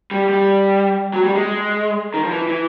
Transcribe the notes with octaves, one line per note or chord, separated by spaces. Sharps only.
G3
G3
F#3
G3
G#3
D#3
F3
E3
E3